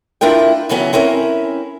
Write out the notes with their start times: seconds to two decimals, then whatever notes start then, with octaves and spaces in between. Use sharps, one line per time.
0.21 D4 E4 F4 A#4 G5
0.69 C#3 E3 F#3 B3 C#4
0.93 C4 C#4 E4 A#4